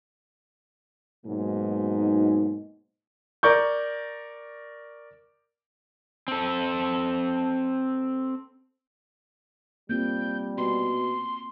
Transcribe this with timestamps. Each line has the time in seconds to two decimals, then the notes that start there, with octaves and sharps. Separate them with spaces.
1.26 G#2 B2 F#3 A#3 D#4
3.43 A#4 D5 C#6 G6
6.28 C4 A4
9.89 G3 A#3 C4 F4 G6
10.57 B2 C6